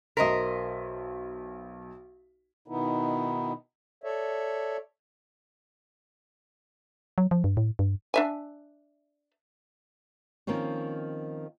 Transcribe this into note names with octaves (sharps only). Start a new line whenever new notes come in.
B1 A#4 C5 D#5 E5 B6
B2 D#3 B3 D#4 E4
A4 C#5 D5 E5
F#3
F3
G2
A2
G2
D4 E5 G#5
D#3 F3 A#3 C4 C#4